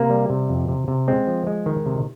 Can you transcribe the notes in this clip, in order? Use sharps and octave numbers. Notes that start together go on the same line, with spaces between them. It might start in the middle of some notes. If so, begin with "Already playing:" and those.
Already playing: C3 A#3
G3
C3
F2
C3
C3
G#3 C4
F3
G#3
D#3
C3